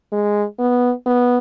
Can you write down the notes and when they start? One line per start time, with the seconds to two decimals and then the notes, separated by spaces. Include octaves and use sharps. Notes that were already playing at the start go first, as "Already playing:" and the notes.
0.12 G#3
0.59 B3
1.06 B3